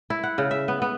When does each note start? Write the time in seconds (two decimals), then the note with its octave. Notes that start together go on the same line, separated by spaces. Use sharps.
0.10 E4
0.23 F#5
0.38 C#3
0.51 E5
0.68 B3
0.82 B3